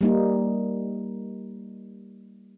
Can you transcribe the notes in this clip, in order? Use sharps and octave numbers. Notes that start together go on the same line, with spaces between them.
G3 A#3 D#4